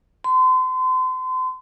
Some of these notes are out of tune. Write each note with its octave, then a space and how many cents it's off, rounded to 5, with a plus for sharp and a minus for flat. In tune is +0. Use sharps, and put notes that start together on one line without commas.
C6 -35